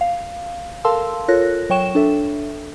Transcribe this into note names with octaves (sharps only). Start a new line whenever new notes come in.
F5
A4 A#4 F5 A5 C6 E6
F4 A4 A#4 C#5 F#6 A#6
F#3 C#5 G5 C#6 E7
D4 A4 E5